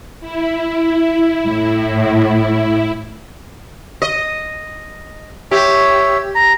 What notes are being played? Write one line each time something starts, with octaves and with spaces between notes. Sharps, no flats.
E4
A2
D#5
G4 C#5 E5
A#5